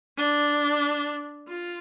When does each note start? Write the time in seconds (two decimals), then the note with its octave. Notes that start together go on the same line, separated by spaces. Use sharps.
0.18 D4
1.48 F4